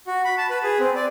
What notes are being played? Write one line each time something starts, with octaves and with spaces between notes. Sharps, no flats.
F#4
B5
A5
B4
G#4
C4
D5